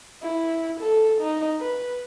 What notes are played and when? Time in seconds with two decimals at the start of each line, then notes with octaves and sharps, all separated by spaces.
0.23 E4
0.80 A4
1.21 D#4
1.60 B4